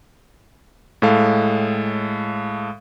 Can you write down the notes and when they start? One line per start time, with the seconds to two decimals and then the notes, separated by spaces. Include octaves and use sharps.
1.02 A2 G#3 A4 F5